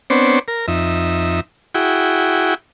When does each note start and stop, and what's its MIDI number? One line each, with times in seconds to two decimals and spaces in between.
0.10 0.39 59
0.10 0.39 60
0.10 0.39 62
0.10 0.39 72
0.10 0.39 73
0.48 0.66 70
0.68 1.40 41
0.68 1.40 63
0.68 1.40 76
1.75 2.54 64
1.75 2.54 66
1.75 2.54 68
1.75 2.54 79